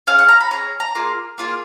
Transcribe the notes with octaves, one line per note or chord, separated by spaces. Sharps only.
C#4 G#4 F5
F#5
A#5
B5
C#4 G#4 A#5
A#5
A#3 F4 G#4
A#3 F4 G#4